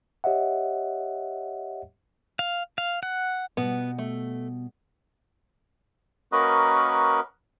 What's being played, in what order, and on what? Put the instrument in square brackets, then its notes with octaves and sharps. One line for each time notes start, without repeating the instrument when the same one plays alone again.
[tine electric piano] G4 C#5 D#5 E5 F#5
[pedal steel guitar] F5
F5
F#5
[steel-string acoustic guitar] B2 G3 [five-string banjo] B3
[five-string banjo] A3
[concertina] A#3 C#4 F#4 A#4 B4 D#5